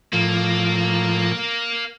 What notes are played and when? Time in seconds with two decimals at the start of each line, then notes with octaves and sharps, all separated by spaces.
0.13 A2 F3 A#3